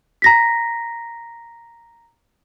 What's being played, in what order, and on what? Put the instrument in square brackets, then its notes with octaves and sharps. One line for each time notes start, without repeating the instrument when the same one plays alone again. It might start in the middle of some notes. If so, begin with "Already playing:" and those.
[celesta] A#5 A#6 B6